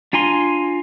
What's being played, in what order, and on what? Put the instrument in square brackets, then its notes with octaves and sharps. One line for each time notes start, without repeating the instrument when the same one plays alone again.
[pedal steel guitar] D4 F4 G#5 A#5 C6